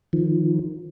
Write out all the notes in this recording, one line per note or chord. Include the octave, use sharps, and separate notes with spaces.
D#3 F3